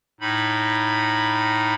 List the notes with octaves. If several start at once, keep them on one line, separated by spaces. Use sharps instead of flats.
A2 D#4 B5